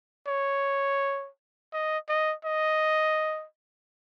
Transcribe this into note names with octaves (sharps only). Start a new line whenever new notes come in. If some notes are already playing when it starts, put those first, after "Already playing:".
C#5
D#5
D#5
D#5